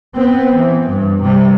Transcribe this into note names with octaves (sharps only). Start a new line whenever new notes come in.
B3 C4
E3
G2
C3 G3